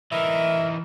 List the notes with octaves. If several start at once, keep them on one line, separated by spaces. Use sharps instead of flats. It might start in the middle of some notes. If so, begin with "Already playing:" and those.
E3 D#4 E4 A#4 E5